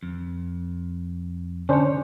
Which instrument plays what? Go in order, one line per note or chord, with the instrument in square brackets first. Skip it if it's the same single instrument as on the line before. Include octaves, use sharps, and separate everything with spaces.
[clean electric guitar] F2
[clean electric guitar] D3 C#5 [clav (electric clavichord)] C#4 D4 C5